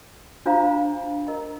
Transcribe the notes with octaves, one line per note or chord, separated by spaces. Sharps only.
D4 F4 C5 F5 A#5
A#4 D#5 A#5